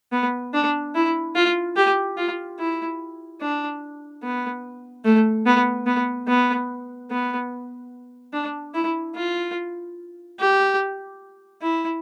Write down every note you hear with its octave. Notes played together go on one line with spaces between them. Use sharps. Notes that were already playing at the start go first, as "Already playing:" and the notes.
B3
D4
E4
F4
G4
F4
E4
D4
B3
A3
B3
B3
B3
B3
D4
E4
F4
G4
E4